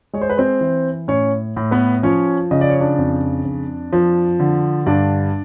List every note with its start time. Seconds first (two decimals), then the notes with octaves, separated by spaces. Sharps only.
0.13 G#3 C#5
0.21 C5
0.29 B4
0.38 C4 C5
0.61 E3
1.08 A2 C#4 C#5
1.56 A2
1.71 B3 B4
2.03 F3 C#4 C#5
2.51 C#3 D#5
2.61 D5
2.70 C#5
2.80 D4 D5
2.98 F2
3.45 F2
3.93 F3
4.40 D3
4.86 G2 D4 D5